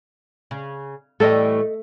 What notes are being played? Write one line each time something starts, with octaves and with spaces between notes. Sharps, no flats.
C#3
A2 E3 G3 A3 A4 D#5